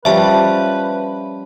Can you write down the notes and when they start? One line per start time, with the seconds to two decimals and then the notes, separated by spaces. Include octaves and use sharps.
0.05 F3 G3 C#4 B4 E5 A5